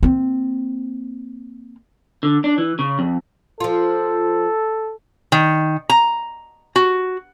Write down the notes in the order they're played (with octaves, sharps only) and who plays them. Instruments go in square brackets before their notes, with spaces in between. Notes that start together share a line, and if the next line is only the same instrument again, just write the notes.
[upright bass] A#3 C4
[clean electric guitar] D3
D4
E3
C#3
F2
[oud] F3 F4 [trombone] A4
[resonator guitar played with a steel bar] D#3
A#5
F#4